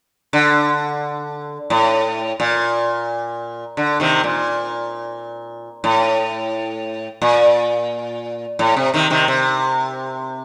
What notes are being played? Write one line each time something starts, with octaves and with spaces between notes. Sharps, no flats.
D3
A2
A#2
D3
C3 D#3
A#2
A2
A#2
A2
C3
C3 D#3
C3 D#3
C3